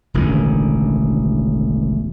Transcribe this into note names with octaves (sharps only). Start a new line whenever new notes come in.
E1 A1 D3 D#3